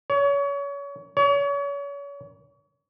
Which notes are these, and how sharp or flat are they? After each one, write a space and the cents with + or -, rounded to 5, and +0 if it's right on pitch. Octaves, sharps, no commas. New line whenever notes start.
C#5 +30
C#5 +35